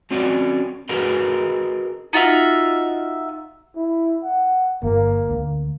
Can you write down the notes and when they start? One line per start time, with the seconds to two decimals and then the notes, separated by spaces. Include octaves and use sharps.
0.11 F#3 C4 C#4 F#4 D5
0.89 F#4 G#4 A#4 B4 D#5
2.13 D#4 F4 F#4 E5
3.76 E4
4.24 F#5
4.83 G1 A#3
5.30 D2